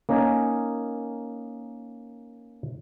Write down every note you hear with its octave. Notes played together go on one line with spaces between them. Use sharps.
A#3 C#4 D#4 A#4 D#5 G#5